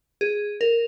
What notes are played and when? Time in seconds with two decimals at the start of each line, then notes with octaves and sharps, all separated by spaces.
0.21 G#4
0.61 A#4